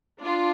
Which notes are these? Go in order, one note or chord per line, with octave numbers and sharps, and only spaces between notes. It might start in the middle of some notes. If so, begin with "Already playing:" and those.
D4 F4